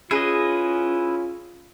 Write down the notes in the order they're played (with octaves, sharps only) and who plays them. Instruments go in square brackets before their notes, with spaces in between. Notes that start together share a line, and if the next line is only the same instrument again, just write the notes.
[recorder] C#4 [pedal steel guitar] E4 B4 D#5 [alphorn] F4 [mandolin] G#4